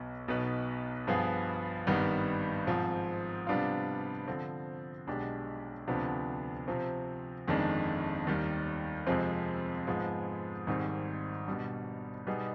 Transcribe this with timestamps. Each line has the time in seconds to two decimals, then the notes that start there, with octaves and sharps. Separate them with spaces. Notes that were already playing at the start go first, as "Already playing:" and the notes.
Already playing: B1 B2 B3
0.28 B1 B2 B3 D#4 B4
1.07 G2 F3 B3 F4 G#4
1.87 G#1 G2 D#3 G3 B3
2.67 G#2 F3 C4
3.47 C3 G3 B3 D4 F4
4.27 D3 F3 C4
5.07 B1 B2 G#3 D4 G4
5.88 D2 C3 F3 B3 D4
6.68 C3 F3 C4
7.47 G1 F2 D#3 G#3 D4
8.27 D#2 D#3 G3
9.07 F2 C3 F3 G#3 C4
9.87 G#2 F3 G#3 B3
10.66 G#1 G#2 D#3 G3 C4
11.47 B2 G3 D4
12.26 B2 G3 B3 D#4 G#4